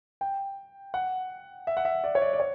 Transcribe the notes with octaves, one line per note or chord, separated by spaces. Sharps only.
G5
F#5
E5
F#5
E5
D5
C#5
D5
D5
C#5